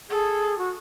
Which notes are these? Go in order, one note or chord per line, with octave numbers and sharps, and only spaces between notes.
G#4 A4
F#4